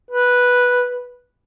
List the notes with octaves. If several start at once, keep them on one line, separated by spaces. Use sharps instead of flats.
B4